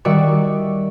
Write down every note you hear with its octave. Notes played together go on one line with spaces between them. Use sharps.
D#3 G3 F#4 D5 E5 C#6